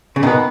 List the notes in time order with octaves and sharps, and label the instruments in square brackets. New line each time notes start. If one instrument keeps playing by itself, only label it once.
[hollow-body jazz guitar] C#3
[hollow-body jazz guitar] B2 [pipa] D#3 G#3 B3